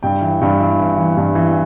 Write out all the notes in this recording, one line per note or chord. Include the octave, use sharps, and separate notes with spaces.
G2 G5
E3
G2
E3
E3
E3
G2
E3